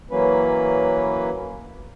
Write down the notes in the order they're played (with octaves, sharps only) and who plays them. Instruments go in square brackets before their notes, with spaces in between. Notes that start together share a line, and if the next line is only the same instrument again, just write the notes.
[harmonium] E3 F#3 A#3 C#4 B4